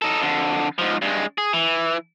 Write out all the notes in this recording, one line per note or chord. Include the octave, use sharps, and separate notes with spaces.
D#4 A4
F2 D3
G#2 F3
G2 G#3
G#4
E3